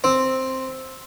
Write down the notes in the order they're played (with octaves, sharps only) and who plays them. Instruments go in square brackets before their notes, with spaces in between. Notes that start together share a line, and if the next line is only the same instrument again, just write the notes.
[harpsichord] C4